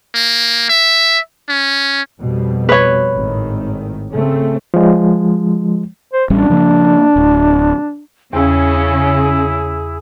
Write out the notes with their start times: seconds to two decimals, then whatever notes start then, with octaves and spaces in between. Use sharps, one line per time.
0.15 A#3
0.70 E5
1.49 C#4
2.21 F2 B2 G3
2.69 B4 C#5
3.16 G#1 A2 D#3
4.13 C#3 A3 C4
4.74 F3 G#3
6.13 C5
6.30 A1 G3 C#4 D4
6.50 C#3 F3 A#3
7.16 D1
8.33 E2 C#3 C#4 E4 G#4 F5